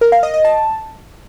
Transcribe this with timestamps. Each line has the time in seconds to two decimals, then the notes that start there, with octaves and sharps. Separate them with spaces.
0.01 A#4
0.12 F5
0.23 D#5
0.34 D#5
0.45 A5